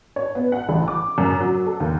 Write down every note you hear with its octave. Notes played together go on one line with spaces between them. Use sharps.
C#5
B3
F#5
A1
D6
F#2
F#3
A4
D#2